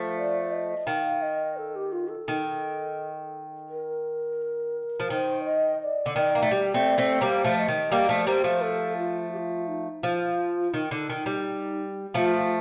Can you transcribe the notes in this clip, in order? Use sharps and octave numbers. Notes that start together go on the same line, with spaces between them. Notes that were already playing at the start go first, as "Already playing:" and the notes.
Already playing: F3 A3
D5
D#5
D#3 F5
D#5
A4
G4
F4
A4
D#3
A#4
F3
D#3 C5
D#5
D#5
D5
D3
D#3 D5
A#3
A3
G3
A3 C4
A3 C4
G3 A#3 C5
F3 A3
D#5
D#3
G3 A#3 D5
F3 A3
G3 A#3 C5
F3 A3
A4
F4
G4
F4
D#4
F3 F4 G4
D#3 D#4
D3
D#3
G3
F3 A3 F4